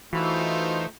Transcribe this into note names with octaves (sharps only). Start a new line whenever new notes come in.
E3 A3 D#4 F4 F#4 C5 B5 E6